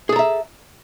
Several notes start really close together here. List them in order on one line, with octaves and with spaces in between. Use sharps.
G#4 A4 A#5 E5